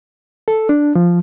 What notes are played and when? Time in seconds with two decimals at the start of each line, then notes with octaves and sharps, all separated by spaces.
0.48 A4
0.69 D4
0.95 F3